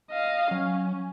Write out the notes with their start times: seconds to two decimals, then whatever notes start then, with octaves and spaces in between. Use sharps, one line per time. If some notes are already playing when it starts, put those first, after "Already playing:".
0.11 D#5 F5
0.51 F#3 C#4